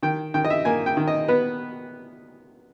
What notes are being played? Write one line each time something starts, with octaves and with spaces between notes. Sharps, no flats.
D#3 G5
D#3 G5
D#5
E5
A#3 G#5
G5
D#3
D#5
B3 B4